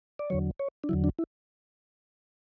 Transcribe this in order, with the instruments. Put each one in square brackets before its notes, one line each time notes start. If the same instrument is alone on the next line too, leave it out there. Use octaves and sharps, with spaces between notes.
[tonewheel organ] D5
E2 D3 F#3 C#5
C#5
D4
E2 D3 F#3 E4
D4
E4